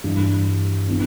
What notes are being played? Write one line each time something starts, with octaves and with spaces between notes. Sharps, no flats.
G2 E3 G3
E3 B3 D4